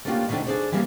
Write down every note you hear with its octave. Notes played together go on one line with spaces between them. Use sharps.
A3 A#3 C#4 D4 F4 G4
B2 D#3 A3 C4 D4
D4 D#4 G#4 A4 C5 D5
E3 F3 G3 A#3 C4